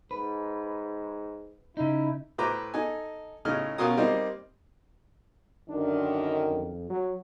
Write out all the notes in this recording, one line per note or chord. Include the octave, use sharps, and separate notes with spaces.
G#2 B4
C#3 D#4 E4
A2 B4 C5 A#5 D6
D#4 A4 G#5
A2 C#3 D#4 F6
B2 C#4 F4 A#4 D#6
G3 A#3 C4 D#4 D#5
F#2 D3 D#3 D4
F2
F#3